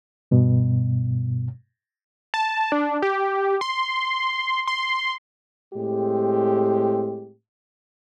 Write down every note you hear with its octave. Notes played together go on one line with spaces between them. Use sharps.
G2 B2
A5
D4
G4
C6
C6
A2 G#3 C4 G4